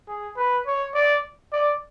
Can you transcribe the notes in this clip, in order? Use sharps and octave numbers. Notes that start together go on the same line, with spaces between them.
G#4
B4
C#5
D5
D5